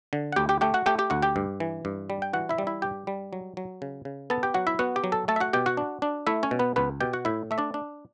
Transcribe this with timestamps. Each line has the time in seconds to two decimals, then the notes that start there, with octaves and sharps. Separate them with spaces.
0.13 D3
0.32 F#5
0.36 D2 G4 G5
0.49 G4 G5
0.61 A3 G4 G5
0.74 F#4 F#5
0.86 A3 G4 G5
0.99 G4 G5
1.10 D2 F#4 F#5
1.22 G4 G5
1.36 G2
1.60 E3
1.85 G2
2.10 G3
2.22 G5
2.33 E3 F#4 F#5
2.49 E4 E5
2.58 G3
2.67 E4 E5
2.82 G2 G4 G5
3.07 G3
3.33 F#3
3.57 F#3
3.82 C#3
4.05 C#3
4.30 B3 A4 A5
4.43 G4 G5
4.54 F#3 F#4 F#5
4.67 E4 E5
4.79 B3 F#4 F#5
4.96 G4 G5
5.04 F#3
5.12 A4 A5
5.28 A3 A4 A5
5.36 E5
5.40 F#4 F#5
5.53 B2 G4 G5
5.66 F#4 F#5
5.77 D4
6.02 D4
6.27 A3 E4 E5
6.43 C#4 C#5
6.51 B2
6.59 B3 B4
6.76 C#2 B3 B4
7.01 B2 G4 G5
7.13 F#4 F#5
7.25 A2 E4 E5
7.51 A3 E5
7.58 D4 D5
7.74 D4